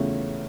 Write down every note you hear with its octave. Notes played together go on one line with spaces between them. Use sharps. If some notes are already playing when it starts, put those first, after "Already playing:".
Already playing: E2 C#3 F3 A3 C#4